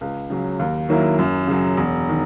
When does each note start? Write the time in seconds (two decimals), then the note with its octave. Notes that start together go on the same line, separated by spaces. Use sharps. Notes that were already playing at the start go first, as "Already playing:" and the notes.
0.01 C#2
0.30 C#3 F#3
0.59 D#2
0.89 D#3 F#3 A#3 E4
1.19 F#2
1.47 C#3 F#3
1.77 E1
2.09 D#3